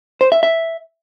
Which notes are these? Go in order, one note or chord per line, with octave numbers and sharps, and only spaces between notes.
C5
E5
E5